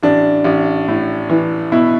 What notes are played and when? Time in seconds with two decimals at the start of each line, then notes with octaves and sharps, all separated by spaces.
0.03 A1 D4
0.44 A1
0.88 A2
1.30 E3
1.72 B2 E4